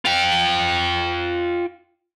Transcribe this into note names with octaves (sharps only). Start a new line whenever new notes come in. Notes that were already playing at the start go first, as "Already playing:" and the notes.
F4 G5